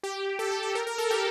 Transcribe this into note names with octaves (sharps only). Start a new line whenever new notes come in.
G4
A4
G4
G4
A#4
A#4
A4
G4